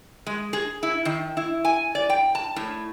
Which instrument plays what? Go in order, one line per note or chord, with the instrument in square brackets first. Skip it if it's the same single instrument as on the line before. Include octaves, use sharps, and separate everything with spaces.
[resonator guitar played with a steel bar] G#3
G#4
E4
D#3
E4
G#5
D5
G5
A5
A2